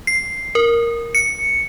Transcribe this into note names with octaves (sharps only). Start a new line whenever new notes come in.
C7
A#4
C#7